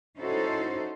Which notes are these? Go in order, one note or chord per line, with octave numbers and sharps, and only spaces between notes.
C#4 D#4 E4 F#4 A4 C5